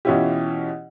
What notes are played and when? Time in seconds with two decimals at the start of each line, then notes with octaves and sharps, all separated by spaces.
0.05 B2 E3 C#4 E4 F4 G4